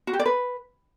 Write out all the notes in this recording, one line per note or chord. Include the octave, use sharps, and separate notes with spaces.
F#4
G4
D5
B4